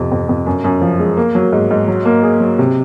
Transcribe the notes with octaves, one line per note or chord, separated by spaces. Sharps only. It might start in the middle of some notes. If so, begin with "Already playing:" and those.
Already playing: F2 C3
F2
F2
F#2
F#2
F3
G#3
A#3
F#3
G#2
G#2
F#3
A#3
G#4
F#3
C3